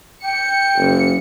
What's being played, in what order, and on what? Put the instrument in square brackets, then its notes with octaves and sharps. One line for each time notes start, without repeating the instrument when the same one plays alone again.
[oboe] G5 [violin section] C#7
[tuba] F#1